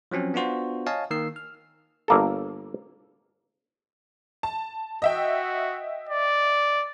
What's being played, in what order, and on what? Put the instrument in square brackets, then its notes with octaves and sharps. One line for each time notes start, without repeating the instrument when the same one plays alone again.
[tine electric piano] F3 F#3 C4 C#4
B3 D4 F4 F#4 C5
C#5 D#5 F5 G#5 A5
D#3 A#3 E6 C7
F6
[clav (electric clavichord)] G1 A#3 A4
[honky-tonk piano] A5
[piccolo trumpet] F#4 [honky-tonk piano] D#5 E5 G5
[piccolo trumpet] D5